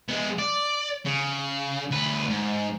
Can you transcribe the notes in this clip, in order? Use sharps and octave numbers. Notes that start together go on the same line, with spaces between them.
G#3 B3
D5
C#3
D2 B4
G#2